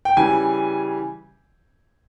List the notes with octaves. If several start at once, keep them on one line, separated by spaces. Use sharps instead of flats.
G5
C#3 E3 G3 G#5